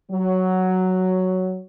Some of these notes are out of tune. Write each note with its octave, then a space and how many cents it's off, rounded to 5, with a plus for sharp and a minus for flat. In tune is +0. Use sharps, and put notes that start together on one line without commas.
F#3 +5